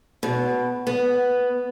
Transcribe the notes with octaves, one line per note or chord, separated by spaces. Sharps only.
B2
B3